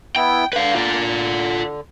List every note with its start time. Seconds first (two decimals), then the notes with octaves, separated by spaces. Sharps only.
0.16 B3 E4 G5
0.53 D3 B4 F5
0.75 F4 D5